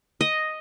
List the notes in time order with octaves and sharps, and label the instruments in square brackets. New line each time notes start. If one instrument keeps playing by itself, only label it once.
[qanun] D#5